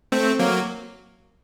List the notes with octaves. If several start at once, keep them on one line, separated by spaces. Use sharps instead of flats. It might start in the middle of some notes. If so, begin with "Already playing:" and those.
A3 C4
F#3 A#3